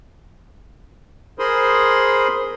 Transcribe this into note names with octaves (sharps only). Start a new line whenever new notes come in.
G#4 A#4 C5 B5 C6 D#6